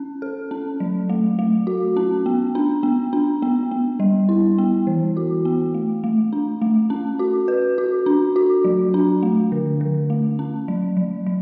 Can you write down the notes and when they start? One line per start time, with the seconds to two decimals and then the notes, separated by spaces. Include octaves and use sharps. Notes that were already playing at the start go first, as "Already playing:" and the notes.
Already playing: C#4
0.22 A4
0.51 C#4
0.80 F#3
1.09 A3
1.39 A3
1.67 F#4
1.97 C#4
2.26 B3
2.55 D4
2.83 B3
3.13 D4
3.42 B3
3.71 B3
4.00 G3
4.29 E4
4.58 B3
4.87 E3
5.17 F#4
5.45 B3
5.74 A3
6.04 A3
6.33 D4
6.62 A3
6.90 C#4
7.19 F#4
7.48 B4
7.78 F#4
8.06 D4
8.36 F#4
8.64 F#3
8.94 D4
9.23 A3
9.52 D3
9.81 D3
10.10 A3
10.39 C#4
10.68 F#3
10.97 F#3
11.27 F#3